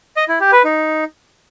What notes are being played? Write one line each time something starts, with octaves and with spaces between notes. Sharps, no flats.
D#5
E4
G4
B4
D#4